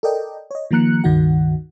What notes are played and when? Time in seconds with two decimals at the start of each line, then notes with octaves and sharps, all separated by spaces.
0.03 A4 A#4 D5 D#5 G5
0.51 C#5 D#5
0.71 D#3 F3 A#3 A#5 F#6 C#7
1.04 C#2 G2 D#3 D#4 F#4 F#5